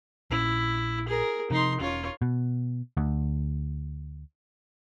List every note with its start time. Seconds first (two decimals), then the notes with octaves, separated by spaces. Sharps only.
0.30 A#1 A#2 C#4 E4
1.08 G#4 A#4
1.50 C3 F3 D#4 C6
1.80 E1 C#4 F4 C#5
2.22 B2
2.97 D2